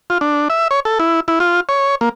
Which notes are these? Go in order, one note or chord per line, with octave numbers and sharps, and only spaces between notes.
F4
D4
E5
C#5
A4
E4
E4
F4
C#5
A#3